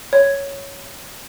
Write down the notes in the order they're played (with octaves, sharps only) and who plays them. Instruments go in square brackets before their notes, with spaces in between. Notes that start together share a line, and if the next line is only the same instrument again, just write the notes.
[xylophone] C#5